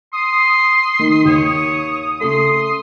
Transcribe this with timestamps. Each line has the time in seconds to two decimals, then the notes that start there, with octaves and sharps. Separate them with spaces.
0.13 C6 D#6
0.99 D#3
1.25 D#2 C#5
2.21 C#3 A3 C6